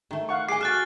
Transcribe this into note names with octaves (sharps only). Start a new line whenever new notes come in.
D#3 A3
F5 F#5 C#6
G#4 D#5 G#5 D6 C7
F#4 A4 F6 F#6 A6